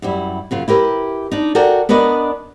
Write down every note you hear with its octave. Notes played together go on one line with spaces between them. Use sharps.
F#2 G3 E4
F#2 C#3 F4
E4 G4 A#4 B4
D4 D#4
F#4 A4 A#4 D5 G5
B3 D4 A#4 B4 D5 D#5